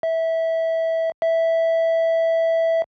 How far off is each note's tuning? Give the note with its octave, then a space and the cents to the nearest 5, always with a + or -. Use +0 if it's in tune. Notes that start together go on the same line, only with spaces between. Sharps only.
E5 -15
E5 -5